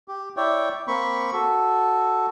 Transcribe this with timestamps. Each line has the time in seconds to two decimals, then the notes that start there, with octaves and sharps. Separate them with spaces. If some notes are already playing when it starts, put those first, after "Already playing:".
0.08 G4
0.37 E4 C#5 D5 G5
0.88 A#3 C4 B5 C#6
1.33 F#4 A4